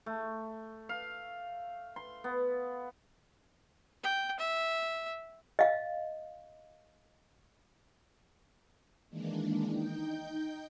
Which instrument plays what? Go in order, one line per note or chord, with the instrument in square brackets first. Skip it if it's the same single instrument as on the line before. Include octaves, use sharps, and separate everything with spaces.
[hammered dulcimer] A3
F5
C6
B3
[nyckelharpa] G5
E5
[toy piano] D#5 F5
[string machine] D#3 E3 G#3 A#3 D4
D#4 G5 G6